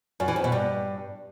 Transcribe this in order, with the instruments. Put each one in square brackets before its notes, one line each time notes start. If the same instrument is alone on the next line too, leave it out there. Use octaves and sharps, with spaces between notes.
[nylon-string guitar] F#2
E3
F2
B2
G2